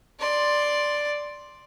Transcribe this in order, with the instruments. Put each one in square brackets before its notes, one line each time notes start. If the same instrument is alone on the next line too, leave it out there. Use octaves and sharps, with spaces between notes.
[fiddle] D5 C6